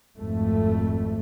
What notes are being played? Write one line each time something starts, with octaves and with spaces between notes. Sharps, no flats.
G#1 F2 A3